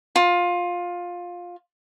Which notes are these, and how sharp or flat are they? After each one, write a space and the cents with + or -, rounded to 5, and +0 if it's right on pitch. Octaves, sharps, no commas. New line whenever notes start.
F4 +15